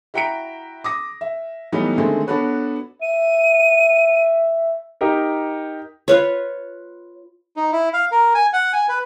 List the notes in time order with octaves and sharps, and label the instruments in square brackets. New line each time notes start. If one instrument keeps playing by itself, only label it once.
[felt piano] E4 F#4 G5 A#5 B6 D7
D6 D#6 A#6
E5
E3 F#3 G3 A3 B3 D#4
D3 D#3 G#3 A3 C4
B3 D4 F#4 A4 B4 C#5
[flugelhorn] E5 [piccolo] D#7
[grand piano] D#4 G4 A#4
[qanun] F4 B4 C#5
[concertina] D#4
E4
F5
A#4
G#5
F#5
G#5
B4